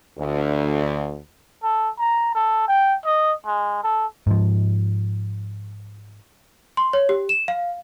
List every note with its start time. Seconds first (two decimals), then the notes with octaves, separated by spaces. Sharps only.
0.18 D2
1.63 A4
1.99 A#5
2.35 A4
2.68 G5
3.05 D#5
3.46 G#3
3.84 A4
4.27 G#2 F3
6.77 C6
6.93 C#5
7.09 G4
7.29 E7
7.48 F5